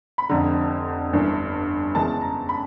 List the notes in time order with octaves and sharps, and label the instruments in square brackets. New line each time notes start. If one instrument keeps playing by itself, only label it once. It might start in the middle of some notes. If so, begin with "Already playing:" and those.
[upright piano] B5
F1 F2 D3 A#5
G1 G2 E3
E2 C#3 E3 G#3 A5
A#5
B5